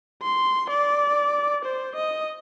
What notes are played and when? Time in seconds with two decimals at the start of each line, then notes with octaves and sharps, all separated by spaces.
0.22 C6
0.69 D5
1.65 C5
1.96 D#5